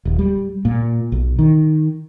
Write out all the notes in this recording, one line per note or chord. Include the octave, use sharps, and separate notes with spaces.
D#1
G3
A#2
B1
D#3